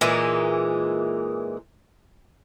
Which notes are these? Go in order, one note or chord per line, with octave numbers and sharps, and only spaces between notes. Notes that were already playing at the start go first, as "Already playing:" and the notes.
A#2 E3 G#3 D#4